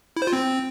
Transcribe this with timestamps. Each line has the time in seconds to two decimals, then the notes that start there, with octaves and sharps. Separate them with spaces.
0.16 E4
0.22 C5
0.27 F4
0.33 C4